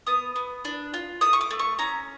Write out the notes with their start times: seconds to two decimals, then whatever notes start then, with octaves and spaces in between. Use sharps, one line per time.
0.07 B3 D#6
0.36 B3
0.65 D4
0.94 F4
1.21 A3 D#6
1.33 C#6
1.41 D6
1.51 A3
1.59 C#6
1.79 C#4 A#5